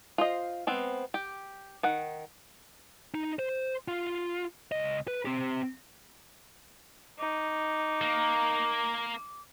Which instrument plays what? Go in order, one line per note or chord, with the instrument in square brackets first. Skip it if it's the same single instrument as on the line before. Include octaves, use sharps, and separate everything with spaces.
[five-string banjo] F4 C5 D#5
G#3 B3 C4
G4
D#3 F#5
[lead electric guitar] D#4
C5
F4
C#2 D#5
B4
C4 G4
[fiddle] D#4 [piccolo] D6
[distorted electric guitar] A#3 [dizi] A#5